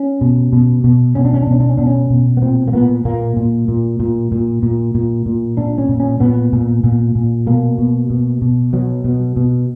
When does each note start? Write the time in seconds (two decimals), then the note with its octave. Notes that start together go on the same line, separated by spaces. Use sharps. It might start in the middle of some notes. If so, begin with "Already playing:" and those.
Already playing: C#4
0.21 B2
0.53 B2
0.84 B2
1.15 B2 C#4
1.25 D4
1.33 C#4
1.42 D4
1.47 B2 C#4
1.60 D4
1.69 C#4
1.77 B2 D4
1.87 C#4
2.10 B2
2.37 B3
2.42 A#2 C4
2.68 A#3
2.73 A#2 B3
3.05 A#2 A#3
3.37 A#2
3.68 A#2
4.00 A#2
4.32 A#2
4.63 A#2
4.95 A#2
5.26 A#2
5.57 A#2 D4
5.78 C#4
5.89 A#2
6.00 C#4
6.20 A#2 B3
6.53 A#2
6.84 A#2
7.15 A#2
7.47 B2 A#3
7.78 B2
8.10 B2
8.42 B2
8.73 B2 F#3
9.04 B2
9.37 B2